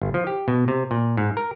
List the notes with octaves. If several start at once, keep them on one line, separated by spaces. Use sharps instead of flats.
G1
F3
G4
B2
C3
A#2
G#2
A#4